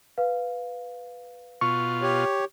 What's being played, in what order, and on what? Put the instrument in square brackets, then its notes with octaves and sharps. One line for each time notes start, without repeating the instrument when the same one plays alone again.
[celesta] B4 F5
[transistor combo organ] B2 F4 [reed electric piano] C#6
[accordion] G4 C#5